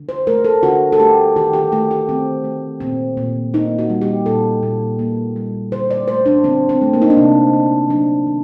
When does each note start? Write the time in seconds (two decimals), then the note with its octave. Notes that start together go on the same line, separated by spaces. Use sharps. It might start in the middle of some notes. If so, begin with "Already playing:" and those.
Already playing: D3
0.09 C5
0.27 A3 A#4
0.45 A4
0.62 D3 F#4
0.92 A4
0.99 A3 G4
1.36 D#3 G4
1.53 G4
1.72 A3 G4
1.91 G4
2.09 D#3 C4
2.44 A3
2.80 A#2 C4
3.17 A#2
3.54 A#3 D#4
3.79 F#4
3.90 G3
4.02 G4
4.26 A#2 A4
4.63 A#2
4.99 A#3
5.36 G3
5.72 D3 C5
5.91 D5
6.08 A3 C5
6.26 D4
6.44 D3 C4
6.69 C4
6.81 A3
6.93 A#3
7.02 D#4
7.10 D4
7.17 C3 C4
7.53 A#3
7.90 F#3 D4
8.27 D#3